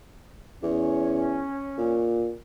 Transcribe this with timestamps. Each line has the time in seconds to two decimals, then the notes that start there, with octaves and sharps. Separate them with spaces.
0.62 E2 C#4
1.78 A#2